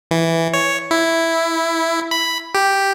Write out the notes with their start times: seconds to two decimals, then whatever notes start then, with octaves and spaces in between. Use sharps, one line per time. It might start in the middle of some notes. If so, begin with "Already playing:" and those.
0.11 E3
0.54 C#5
0.91 E4
2.11 B5
2.55 G4